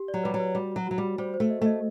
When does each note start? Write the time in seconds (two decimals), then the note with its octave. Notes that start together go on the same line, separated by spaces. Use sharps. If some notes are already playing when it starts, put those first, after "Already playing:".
Already playing: G4
0.08 D5
0.14 F#3
0.23 G3 B4
0.34 F#3
0.40 B4
0.55 G3 F#4
0.71 F#3 F#4
0.87 F#3 F#4
0.98 G3 F#4
1.18 G3 C5
1.34 C5
1.40 A3
1.50 D#5
1.61 A3 D#5